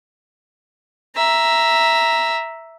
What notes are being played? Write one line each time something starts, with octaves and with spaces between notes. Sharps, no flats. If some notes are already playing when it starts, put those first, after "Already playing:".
E5 A#5